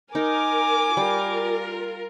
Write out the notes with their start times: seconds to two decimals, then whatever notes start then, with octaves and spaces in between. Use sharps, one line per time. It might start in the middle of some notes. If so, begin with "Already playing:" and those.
0.15 D#4 A#4 G#5 D6
0.97 G3 F4 A#4